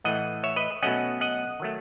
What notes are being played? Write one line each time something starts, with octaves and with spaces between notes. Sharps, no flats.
A2 E3 A3 D#5 F#5
C#5 E5
B4 D#5
B2 F#3 A3 C#4 D#5 F#5
D#5 F#5
D#3 F#3 A3